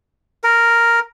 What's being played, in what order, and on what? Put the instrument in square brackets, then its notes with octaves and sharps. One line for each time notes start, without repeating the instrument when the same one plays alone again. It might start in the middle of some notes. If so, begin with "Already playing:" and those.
[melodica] A#4